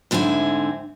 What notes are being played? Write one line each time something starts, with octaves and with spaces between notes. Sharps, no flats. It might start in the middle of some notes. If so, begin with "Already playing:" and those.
G#2 D3 C4 E4 G#5